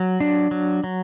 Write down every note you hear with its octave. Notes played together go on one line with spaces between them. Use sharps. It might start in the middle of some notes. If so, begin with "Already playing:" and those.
Already playing: F#3
D4
F#3
F#3